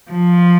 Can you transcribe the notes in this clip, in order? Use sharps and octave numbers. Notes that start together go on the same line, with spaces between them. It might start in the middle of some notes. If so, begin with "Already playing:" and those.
F3